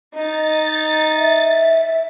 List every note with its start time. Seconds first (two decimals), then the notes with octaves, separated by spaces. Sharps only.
0.14 D#4 D#5 A6
1.15 E5